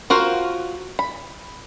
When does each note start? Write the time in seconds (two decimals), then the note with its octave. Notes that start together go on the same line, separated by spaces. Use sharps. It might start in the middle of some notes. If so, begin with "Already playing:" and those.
0.10 F4 F#4 A#4 C5
0.99 B5